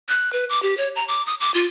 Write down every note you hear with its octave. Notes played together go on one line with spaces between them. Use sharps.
F#6
B4
D6
G4
C#5
A#5
D6
D#6
D6
F4